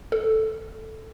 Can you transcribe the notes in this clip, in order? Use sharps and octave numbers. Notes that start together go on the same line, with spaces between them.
A4